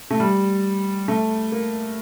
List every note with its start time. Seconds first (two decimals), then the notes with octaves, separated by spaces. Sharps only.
0.11 A3
0.20 G3
1.08 A3
1.52 A#3